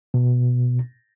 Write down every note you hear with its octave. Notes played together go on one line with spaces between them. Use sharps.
B2